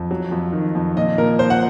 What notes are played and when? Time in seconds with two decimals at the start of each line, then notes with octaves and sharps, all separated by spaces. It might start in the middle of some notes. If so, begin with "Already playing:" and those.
Already playing: F2
0.11 F#3
0.31 F2
0.53 D#3
0.75 F2
0.97 A#2 D#5
1.18 A#2 A#4
1.39 F3 C5
1.50 F#5